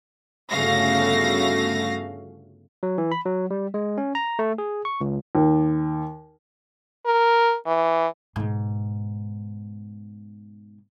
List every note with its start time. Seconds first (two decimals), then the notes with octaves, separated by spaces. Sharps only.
0.50 G1 C#3 A3 F#4 F5 A#6
2.83 F#3
2.98 E3
3.12 B5
3.25 F#3
3.51 G3
3.74 G#3
3.98 C#4
4.15 A#5
4.39 A3
4.58 G#4
4.85 C#6
5.01 C#2
5.35 D#2
7.06 A#4
7.67 E3
8.36 G#2 B2